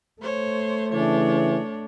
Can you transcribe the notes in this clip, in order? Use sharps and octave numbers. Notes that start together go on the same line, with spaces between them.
A3 C5 C#5
C#3 E3 D4 C#5